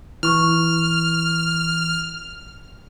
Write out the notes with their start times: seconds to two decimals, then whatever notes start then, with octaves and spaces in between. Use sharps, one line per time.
0.23 E3 E4 C#6 F6